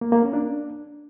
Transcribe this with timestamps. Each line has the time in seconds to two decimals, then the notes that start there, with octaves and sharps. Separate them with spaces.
0.01 A#3
0.12 A#3
0.23 C#4
0.33 D4